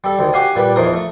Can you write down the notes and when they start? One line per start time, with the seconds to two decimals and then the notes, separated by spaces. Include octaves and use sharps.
0.04 G3 A4
0.19 D2 D#3
0.33 F#4 G4 F5 G#5
0.56 A#2 G3 B4
0.76 E2 E3 F3 D#4 A#4
0.94 A3